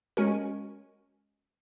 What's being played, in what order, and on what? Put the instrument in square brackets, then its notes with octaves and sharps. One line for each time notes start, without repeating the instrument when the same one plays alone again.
[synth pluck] G#3 C#4 F#4 A#4